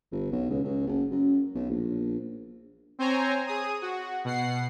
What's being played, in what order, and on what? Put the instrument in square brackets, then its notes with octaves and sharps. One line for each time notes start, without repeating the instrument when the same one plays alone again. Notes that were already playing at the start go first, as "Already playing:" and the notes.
[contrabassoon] G1
B1
C#2
C#2
F#1
F#2
B1
A#1
[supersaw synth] C4 C5 C#5 G#5 A#5
G#4 D#6
F#4
B2 F#5 C7